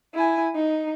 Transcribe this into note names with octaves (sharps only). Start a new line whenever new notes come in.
E4 G#5
D#4